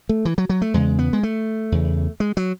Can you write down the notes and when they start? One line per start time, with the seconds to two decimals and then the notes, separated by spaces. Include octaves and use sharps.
0.09 A3
0.25 E3
0.38 F#3
0.49 F#3
0.62 A3
0.74 E2 C#3 G#3
0.99 B3
1.13 G#3
1.23 A3
1.72 E2 C#3
2.20 G#3
2.37 F#3